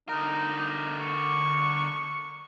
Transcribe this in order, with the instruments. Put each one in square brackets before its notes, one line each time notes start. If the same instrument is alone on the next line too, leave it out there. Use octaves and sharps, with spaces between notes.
[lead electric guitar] D3 A#4 [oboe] D#4
[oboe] C#6